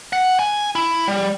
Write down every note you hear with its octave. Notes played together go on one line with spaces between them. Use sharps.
F#5
G#5
E4
G3